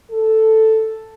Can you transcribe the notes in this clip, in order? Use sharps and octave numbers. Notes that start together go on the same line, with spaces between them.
A4